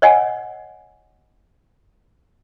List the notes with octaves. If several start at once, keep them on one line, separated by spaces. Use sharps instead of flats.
C#5 D#5 F#5 G#5